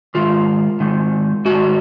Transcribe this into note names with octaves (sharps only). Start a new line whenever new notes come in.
G#2 D#3 F4
G#2 D#3
G#2 D#3 F#4